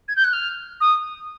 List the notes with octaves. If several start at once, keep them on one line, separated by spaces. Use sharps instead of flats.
G#6
G6
F#6
F6
D#6